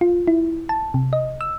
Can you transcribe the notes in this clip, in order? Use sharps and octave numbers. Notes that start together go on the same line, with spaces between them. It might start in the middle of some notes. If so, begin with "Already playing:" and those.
F4
E4
A5
C3
D#5
E6